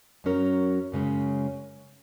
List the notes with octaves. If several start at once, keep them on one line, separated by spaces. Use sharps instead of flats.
F#2 F#3 C#4 A#4
F#2 C#3 G#3 C#4